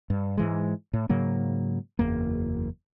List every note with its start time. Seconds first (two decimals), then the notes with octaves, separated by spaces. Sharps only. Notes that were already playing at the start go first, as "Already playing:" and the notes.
0.10 G2
0.37 G#2 E3 G#3
0.93 A2
1.09 G#2 C#3 F#3 A#3
1.99 F#1 E2 A#3